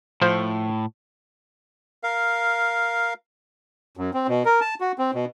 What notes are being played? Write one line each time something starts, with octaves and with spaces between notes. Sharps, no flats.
A2 F3 C5
A#4 F5
F#2
C4
B2
A#4
A5
F#4
C4
B2